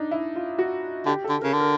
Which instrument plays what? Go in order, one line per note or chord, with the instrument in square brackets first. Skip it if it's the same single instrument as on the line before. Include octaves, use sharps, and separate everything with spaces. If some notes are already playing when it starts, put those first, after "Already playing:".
Already playing: [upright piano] D4 D#4
E4
F4
F#4
[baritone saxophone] D3 [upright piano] G4
[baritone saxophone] D3 [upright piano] A4
[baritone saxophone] C#3 [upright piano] A#4
[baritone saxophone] D3
[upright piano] A#4